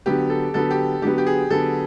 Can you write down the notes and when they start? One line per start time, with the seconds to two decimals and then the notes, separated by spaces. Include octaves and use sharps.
0.06 D3 F#3 B3 G4
0.30 A4
0.54 D3 F#3 B3 A4
0.71 G4
1.02 D3 F#3 B3 G4
1.18 G4
1.27 G#4
1.50 D3 F#3 B3 A4